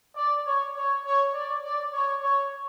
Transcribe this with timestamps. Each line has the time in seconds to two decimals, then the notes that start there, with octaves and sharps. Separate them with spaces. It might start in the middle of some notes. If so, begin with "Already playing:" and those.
0.16 D5
0.46 C#5
0.76 C#5
1.05 C#5
1.34 D5
1.64 D5
1.94 C#5
2.23 C#5